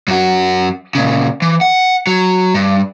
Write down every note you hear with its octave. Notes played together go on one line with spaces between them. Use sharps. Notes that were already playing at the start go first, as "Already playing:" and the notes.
F#2 F#4
A#2 C#3
E3
F#5
F#3
G2